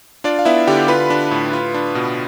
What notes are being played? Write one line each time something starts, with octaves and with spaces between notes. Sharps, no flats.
D4 F4 D5
F5
B3 E4 E5
D3 G4 G5
F4 B4 B5
D4
A2
F4
D4
B2